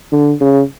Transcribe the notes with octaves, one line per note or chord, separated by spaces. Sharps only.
D3
C#3